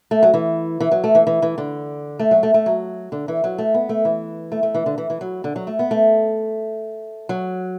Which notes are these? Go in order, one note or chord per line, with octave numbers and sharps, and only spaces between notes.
A3
F#3
E3
E3
F#3
A3
E3
E3
E3
D3
A3
F#3
A3
A3
F#3
D3
E3
F#3
A3
B3
A3
E3
A3
A3
E3
D3
E3
E3
F#3
D3
F#3
A3
B3
A3
F#3